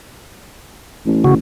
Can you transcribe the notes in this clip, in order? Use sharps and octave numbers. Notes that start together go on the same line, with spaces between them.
A1
C#3 F#4